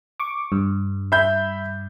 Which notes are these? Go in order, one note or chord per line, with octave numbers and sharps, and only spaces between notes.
C#6 D6
G2
E5 B5 G6